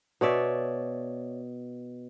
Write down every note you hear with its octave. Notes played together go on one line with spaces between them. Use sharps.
B2 C#5 D5 E5